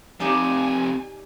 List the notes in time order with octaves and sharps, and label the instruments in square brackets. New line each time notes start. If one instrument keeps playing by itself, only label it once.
[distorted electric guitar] F2 C3 [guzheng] D#4 G4 D5 [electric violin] G#5